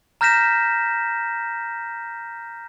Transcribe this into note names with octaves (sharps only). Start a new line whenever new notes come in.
A#5 F6 G6 A#6 B6 E7